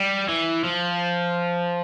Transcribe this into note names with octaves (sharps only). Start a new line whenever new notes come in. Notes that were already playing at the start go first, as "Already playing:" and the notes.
Already playing: G3
E3
F3